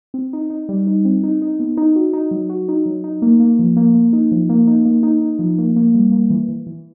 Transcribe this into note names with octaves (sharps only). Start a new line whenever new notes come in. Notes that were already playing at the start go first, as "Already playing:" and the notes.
C4
D#4
D#4
G3
D#4
C4
D#4
D#4
B3
D#4
F#4
D#4
F#3
F#4
D#4
F#3
D#4
A#3
A#3
F3
A#3
A#3
D#4
F3
A#3
D#4
A#3
D#4
D#4
F3
A#3
A#3
G3
A#3
E3
E3
E3